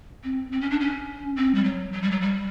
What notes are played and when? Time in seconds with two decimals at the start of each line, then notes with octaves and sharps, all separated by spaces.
0.24 C4
0.52 C4
0.61 C#4
0.71 D4
0.80 C#4
1.36 C4
1.55 G3
1.64 F#3
1.93 F#3
2.02 G3
2.11 F#3
2.21 G3